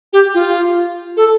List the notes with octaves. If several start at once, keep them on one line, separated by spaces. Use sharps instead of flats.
G4
F4
A4